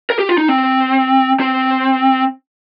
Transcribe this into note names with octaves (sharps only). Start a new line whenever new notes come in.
A#4
G4
F4
D#4
C4
C4